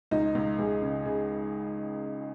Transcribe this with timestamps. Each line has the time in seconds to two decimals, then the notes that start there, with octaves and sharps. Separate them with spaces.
0.11 C#2 D#4
0.35 C#2
0.59 C#2 G#4
0.82 C#3
1.06 C#3 G#4